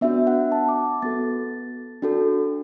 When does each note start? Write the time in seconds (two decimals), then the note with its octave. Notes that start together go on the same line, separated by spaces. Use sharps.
0.01 B3 D4 F#4 E5
0.27 F#5
0.52 A5
0.69 D6
1.02 B3 F#4 A4 A6
2.02 D4 F#4 A4